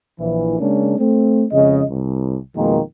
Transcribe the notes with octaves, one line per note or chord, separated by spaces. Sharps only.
A#1 E3
C#3 G#3 A#3 C#4 D4
A3 C4
F2 C#3 G#3 D#5
C2
F2 B2 D#3 G#3 A#3